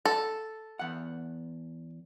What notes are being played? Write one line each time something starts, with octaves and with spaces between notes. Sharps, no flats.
A4
E2 F#5